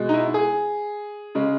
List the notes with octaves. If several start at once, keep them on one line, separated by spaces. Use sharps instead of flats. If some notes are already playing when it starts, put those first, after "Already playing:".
Already playing: B2 G#3
D#4
E4
G#4
C#3 G#3